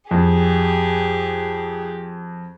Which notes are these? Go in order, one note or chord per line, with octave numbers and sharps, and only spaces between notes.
F2 G4 G#4